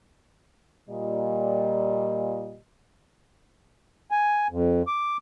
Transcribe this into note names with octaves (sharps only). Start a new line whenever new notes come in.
A#2 G3 D#5
G#5
F2
D6